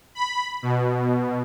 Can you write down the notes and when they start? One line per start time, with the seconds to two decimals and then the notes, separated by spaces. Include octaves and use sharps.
0.15 B5
0.62 B2